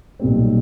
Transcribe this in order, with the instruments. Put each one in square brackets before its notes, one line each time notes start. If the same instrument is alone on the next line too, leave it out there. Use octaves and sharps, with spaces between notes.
[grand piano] B1 A#2 G3 C4